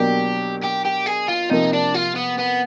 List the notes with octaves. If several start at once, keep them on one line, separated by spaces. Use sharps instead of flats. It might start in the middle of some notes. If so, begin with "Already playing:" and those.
Already playing: B2 F#3 A#3 D4 G4
G4
G4
G#4
F4
C3 F3 A#3 D#4
D4
F4
B3
B3